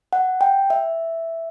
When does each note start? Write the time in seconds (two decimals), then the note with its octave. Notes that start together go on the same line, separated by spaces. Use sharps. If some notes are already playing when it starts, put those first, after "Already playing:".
0.13 F#5
0.41 G5
0.70 E5